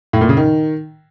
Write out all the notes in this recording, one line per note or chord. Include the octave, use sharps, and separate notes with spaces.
A2
A#2
C#3
D#3